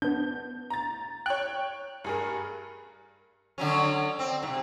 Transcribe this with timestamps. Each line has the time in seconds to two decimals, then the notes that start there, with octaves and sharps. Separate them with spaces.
0.02 B3 D4 G6
0.70 A#5 A6
1.26 C#5 G5 F#6
2.04 G2 G#4 A#4
3.58 D3 F#3 C#4
4.19 C4
4.43 G#2 C3